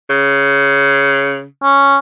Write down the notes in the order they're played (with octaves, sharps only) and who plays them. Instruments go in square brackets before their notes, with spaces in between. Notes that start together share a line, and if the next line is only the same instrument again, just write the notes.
[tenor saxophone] C#3
[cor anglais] C#4